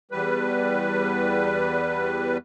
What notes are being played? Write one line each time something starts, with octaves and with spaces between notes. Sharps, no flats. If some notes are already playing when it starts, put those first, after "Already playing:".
E2 G3 B4